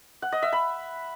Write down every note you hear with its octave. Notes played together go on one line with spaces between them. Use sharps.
F#5
D#5
E5
B5